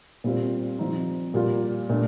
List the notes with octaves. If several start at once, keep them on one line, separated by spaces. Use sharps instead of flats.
A#2 G3 C4 F4
F3 C4 D#4
A#2 G3 A#3 F4
A#2 A3 D4